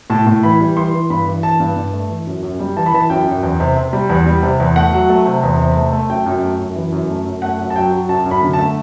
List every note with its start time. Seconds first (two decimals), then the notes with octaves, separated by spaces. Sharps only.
0.10 A2 A5
0.27 A2
0.43 E3 B5
0.60 G3
0.76 E3 C6
0.94 E3
1.10 G2 B5
1.27 E3
1.43 E3 A5
1.60 G2
1.76 G2
1.93 A3
2.10 E3
2.27 F#2
2.43 F#2
2.59 G3
2.77 E3 A5
2.86 B5
2.93 E3 A5
3.10 F#2 G5
3.27 F#2
3.43 E2
3.60 C3
3.76 C3
3.93 G3
4.09 E2
4.26 G3
4.43 C3
4.60 E2
4.76 A3 F#5
4.93 F#3
5.09 A3
5.26 C3
5.43 E2
5.59 C3
5.76 A3
5.93 A3
6.09 F#2 G5
6.26 F#2
6.43 A3
6.59 F#2
6.76 E3
6.92 F#2
7.10 A3
7.26 F#2
7.42 A3 F#5
7.60 F#2
7.70 A5
7.76 F#3 G5
7.92 F#3
8.09 F#2 A5
8.26 F#2
8.31 B5
8.42 D3
8.53 A5
8.59 A3